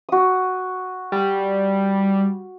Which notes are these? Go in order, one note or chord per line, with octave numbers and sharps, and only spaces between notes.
F#4 D#6
G3